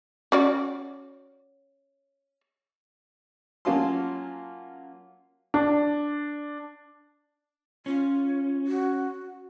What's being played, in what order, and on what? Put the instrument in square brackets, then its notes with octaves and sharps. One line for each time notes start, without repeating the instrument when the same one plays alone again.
[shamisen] C#4 F#4 D5
[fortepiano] F#3 A#3 C#4 F4 A5 C6
[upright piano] D4
[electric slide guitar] C#4 [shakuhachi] F4
[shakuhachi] F#4